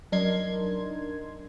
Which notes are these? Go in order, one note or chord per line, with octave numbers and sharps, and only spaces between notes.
F#2 D4 D#4 A#4 C6 G#6